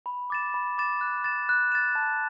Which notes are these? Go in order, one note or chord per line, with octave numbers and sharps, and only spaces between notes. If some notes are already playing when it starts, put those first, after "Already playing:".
B5
D6 A6 E7
B5
D6 A6 E7
F#6
A6 E7
F#6
A6 E7
A5